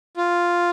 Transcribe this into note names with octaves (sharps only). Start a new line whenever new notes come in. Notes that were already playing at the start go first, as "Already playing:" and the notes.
F4